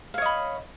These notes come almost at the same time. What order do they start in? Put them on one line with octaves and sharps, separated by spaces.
F5 C#5 D#5 B5